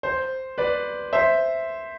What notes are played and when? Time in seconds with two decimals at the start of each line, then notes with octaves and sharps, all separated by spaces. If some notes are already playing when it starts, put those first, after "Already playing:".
0.03 C5
0.58 B4 D5
1.13 C5 E5